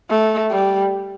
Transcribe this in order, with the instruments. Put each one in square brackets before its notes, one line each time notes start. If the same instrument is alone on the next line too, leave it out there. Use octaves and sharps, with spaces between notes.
[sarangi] A3
G3